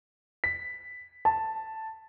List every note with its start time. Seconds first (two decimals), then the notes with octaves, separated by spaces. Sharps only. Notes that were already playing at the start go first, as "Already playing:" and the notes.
0.44 B6
1.25 A5